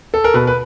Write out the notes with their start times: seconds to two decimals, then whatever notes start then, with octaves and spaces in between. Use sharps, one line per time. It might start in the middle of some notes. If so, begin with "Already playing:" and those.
0.14 A4
0.24 A#4
0.34 B2 B4
0.47 B4